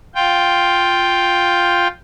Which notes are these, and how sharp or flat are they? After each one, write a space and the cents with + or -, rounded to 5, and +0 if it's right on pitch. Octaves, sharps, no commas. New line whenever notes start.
F4 +5 G5 +0